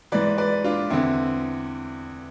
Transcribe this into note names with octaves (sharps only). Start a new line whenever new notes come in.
G#2 E3 B4 D5
B4 D5
D4 F4
E2 D3 C4 E4